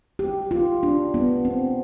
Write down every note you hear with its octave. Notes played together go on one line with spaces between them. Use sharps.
G4
F4
D4
B3
C4